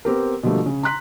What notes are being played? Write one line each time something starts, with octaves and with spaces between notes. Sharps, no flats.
B3 C4 G4 A#4
B2 D3 F3 G3 A3 A#3
C#3
A#5 C6 F#6 B6